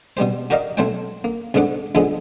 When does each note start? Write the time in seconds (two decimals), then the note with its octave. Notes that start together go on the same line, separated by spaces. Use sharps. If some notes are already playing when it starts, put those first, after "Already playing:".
0.17 B2 G3 G4 C5
0.50 F#4 G4 A#4 D5 D#5 F5
0.77 B1 A3 C4 C5 C#5 G5
1.24 A#3
1.54 C2 G#2 D3 B3 F#5 D6
1.95 C#2 F#2 D3 F3 G#3 B3